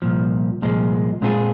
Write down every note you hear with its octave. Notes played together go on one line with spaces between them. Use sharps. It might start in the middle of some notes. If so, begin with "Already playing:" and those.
C2 A#2 F3
C2 A#2 F3 G#3
A#2 G#3 C4 F4 G#4